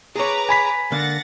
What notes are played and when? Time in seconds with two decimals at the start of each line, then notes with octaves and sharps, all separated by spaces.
0.16 G#4 B4 C#5 A#5 D6
0.49 G#5 B5 B6
0.92 D3 A#3 D4 F#5 A6 A#6